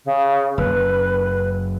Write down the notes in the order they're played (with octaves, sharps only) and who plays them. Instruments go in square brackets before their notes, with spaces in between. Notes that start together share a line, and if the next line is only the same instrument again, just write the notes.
[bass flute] C#3
[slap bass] F#1 [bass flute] B4